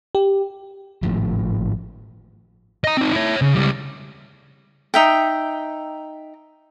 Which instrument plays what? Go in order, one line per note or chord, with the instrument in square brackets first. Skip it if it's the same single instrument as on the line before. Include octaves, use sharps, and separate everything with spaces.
[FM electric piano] G4
[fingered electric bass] G#1 A2 F3
[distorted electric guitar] D#5 A#5
C4 D#4
E4 C#5
C#3
C#2 G3
[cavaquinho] D#4 E5 G5